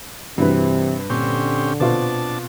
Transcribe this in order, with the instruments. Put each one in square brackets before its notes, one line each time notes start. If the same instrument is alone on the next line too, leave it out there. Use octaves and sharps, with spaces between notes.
[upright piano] G2 B4 [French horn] C3 [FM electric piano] E3 E4 F#4
[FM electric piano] A#2 [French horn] D3 [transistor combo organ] C4 C#4 G4
[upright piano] B2 C4 F4 [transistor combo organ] D4 A5